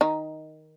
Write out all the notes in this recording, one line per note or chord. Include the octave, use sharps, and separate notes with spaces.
D#3 D#4